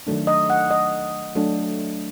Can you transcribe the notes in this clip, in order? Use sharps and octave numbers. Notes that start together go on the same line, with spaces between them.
D#3 F#3 A3 D4
D#5
F#5
D#5
F#3 A3 D4